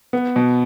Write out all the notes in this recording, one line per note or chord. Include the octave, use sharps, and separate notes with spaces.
B3
B2